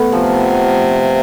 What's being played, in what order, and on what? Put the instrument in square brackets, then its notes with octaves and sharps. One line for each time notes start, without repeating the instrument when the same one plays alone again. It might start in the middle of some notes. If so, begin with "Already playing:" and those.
Already playing: [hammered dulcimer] A3 B3
[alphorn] C3 [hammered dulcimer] F3